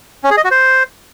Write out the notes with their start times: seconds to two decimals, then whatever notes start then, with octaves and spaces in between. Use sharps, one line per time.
0.24 C#4
0.31 G#4
0.37 D#5
0.44 F#4
0.51 C5